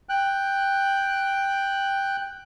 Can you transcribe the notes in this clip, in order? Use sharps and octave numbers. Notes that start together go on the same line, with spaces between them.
G5 F#6